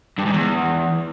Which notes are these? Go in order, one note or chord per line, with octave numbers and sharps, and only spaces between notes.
G2
G#2
E2